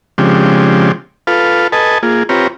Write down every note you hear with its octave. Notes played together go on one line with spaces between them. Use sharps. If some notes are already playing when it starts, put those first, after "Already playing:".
C#3 F3 G#3 C4 D4 G4
F4 A4 B4 F5
A4 B4 D#5 G#5 A5
A#3 F4 G#4
C4 F4 G4 B4 C#5 A#5